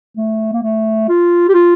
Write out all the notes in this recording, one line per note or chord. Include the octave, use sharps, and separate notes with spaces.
A3
A#3
A3
F4
G4
F4